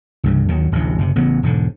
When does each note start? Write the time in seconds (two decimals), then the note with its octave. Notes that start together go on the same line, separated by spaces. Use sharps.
0.24 C2 G2 C#3
0.48 D#2 D#3 F#3
0.72 D1 A1 D2 C3
0.98 F#1 C3
1.15 A1 C#3 B3
1.43 E1 G#2 D3